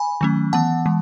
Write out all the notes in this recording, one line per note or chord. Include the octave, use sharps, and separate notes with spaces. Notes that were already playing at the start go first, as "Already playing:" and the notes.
Already playing: G#5 B5
D#3 F#3 A3 C#4
E3 B3 F#5 A5
E3 G#3